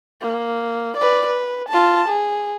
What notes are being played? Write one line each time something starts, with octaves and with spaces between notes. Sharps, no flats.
A#3
B4 D5
B4
F4 A5
G#4